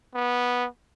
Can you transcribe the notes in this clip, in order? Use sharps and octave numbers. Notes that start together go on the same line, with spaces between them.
B3